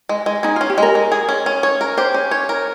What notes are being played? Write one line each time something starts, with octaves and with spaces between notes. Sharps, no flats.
G#3
G#3
D#4 G#4
F4
C#4
G4
G#3 A#4
G#3
G#4
C#4
C#4
C#5
A#4
G4 C5
C#4
C#5
A#4